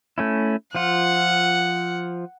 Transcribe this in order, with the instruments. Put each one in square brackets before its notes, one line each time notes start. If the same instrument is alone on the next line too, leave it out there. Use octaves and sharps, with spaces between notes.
[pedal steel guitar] A3 C#4 E4
[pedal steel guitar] F3 F4 [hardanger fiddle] F#5